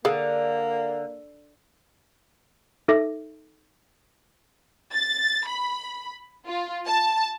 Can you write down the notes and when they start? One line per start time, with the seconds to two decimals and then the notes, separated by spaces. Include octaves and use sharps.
0.05 D3 A#3 G#4 A4 F5
2.88 D#4 A4 E5 D6 A#6
4.92 A6
5.47 B5
6.47 F4
6.86 A5